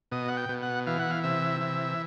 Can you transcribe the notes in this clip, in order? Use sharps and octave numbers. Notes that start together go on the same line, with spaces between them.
B2 D#5
F#5
G5
B2
F#5
E3 F5
F#5
F5
C3 E5
E3